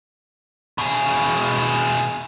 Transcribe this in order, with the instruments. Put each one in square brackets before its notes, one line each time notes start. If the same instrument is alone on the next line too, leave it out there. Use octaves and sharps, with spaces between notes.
[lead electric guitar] B2 G#4